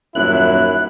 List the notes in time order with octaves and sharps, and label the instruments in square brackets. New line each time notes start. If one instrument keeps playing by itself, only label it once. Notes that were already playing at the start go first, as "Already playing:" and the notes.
[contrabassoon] D#1 [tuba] F#2 [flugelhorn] E4 [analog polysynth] F#6